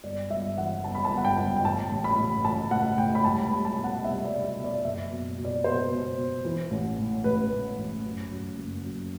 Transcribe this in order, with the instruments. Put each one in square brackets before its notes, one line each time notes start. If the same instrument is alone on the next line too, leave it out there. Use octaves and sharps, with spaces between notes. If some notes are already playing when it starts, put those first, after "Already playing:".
[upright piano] G1 D5
G1 E5
E3 F#5
G1 A5
B5
A5
G1
F#5
G5
G1
G5
A1 A5
A1
B5
A1
A1 A5
A2 F#5
A2 G5
B5
C2 A5
B5
C2
A5
B2
F#5
C2 E5
D5
C2
E5
B2
D5
F#1 E5
B2
B2
D5
B2 C5
B2
B2
E3
A1
A2
A1 B4
A2
A1
F#2
F#2
F#1
F#2